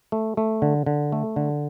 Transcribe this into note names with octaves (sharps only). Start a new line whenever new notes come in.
A3
A3
D3
D3
A3
D3